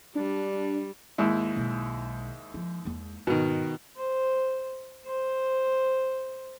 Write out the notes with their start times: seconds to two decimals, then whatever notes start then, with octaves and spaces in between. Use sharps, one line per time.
0.15 G3 D4
1.18 D#2 G#2 E4
1.56 B1 G#3
2.54 F3
2.85 E2 G#3
3.27 G#2 B2 D#3
3.96 C5
5.06 C5